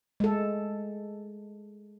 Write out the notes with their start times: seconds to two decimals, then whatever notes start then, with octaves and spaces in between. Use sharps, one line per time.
0.20 G#3 A4